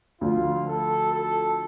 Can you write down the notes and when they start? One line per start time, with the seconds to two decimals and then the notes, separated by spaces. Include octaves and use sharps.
0.21 D2 D3 F3 F4
0.68 A4
1.12 A4